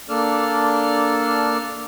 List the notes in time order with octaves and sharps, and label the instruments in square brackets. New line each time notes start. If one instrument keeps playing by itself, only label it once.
[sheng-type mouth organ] A#3 D4 A4 D5 A5 F6